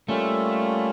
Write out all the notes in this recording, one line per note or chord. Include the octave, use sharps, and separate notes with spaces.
G3 A3 A#3 C#4 F4